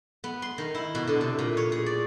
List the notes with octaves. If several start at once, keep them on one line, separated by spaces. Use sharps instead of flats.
B3
C6
D#3
E4
B2
D3
C3
A#2
C#5
G#4
D5